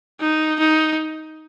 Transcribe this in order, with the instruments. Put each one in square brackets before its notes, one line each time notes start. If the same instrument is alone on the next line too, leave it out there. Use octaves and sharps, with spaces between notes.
[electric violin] D#4
D#4